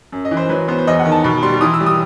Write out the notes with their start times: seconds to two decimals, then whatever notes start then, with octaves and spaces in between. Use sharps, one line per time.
0.12 F#2
0.25 D#5
0.31 E3
0.37 C5
0.49 F#3 B4
0.68 B3 C5
0.78 C5
0.87 E2 D#5
1.00 F#5
1.05 D#3
1.12 A5
1.24 B2 B5
1.42 G3 C6
1.61 E3 D#6
1.74 E6
1.80 G3
1.86 D#6